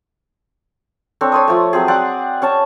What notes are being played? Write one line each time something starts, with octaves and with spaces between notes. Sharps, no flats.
C4 D4 A4 C#5
C#5 C6 D#6
F3 A3
F#3 C4 G#4
C4 D5 F#5 D6
C#4 C#5 A5